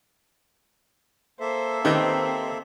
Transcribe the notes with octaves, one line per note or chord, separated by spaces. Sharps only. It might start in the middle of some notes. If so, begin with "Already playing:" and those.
A#3 A4 C5 E5
D#3 C4 G4 B4 C5 D#5